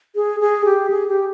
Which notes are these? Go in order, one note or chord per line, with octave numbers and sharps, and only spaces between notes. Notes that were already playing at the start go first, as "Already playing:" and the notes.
G#4
G#4
G4
G#4
G4